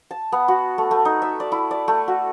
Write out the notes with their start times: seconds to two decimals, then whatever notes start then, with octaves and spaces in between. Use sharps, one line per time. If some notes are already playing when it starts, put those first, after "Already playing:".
0.11 A5
0.32 B3
0.48 F#4
0.78 A3
0.91 A3
1.05 D#4
1.22 E5
1.40 D5
1.52 E4
1.71 D5
1.88 A3
2.08 F#4